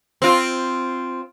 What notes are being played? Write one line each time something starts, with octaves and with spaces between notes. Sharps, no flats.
C4 F4